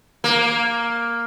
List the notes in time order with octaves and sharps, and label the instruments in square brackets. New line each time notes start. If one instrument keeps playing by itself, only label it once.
[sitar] A#3